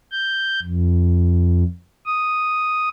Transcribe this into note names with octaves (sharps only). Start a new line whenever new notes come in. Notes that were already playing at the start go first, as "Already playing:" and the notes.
G6
F2
D#6